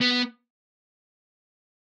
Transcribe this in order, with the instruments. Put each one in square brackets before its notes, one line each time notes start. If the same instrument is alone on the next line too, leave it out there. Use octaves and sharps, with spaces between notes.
[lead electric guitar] B3